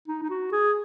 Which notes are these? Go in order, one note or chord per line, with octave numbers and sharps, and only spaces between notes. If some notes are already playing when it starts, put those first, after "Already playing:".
D#4
D#4
F#4
G#4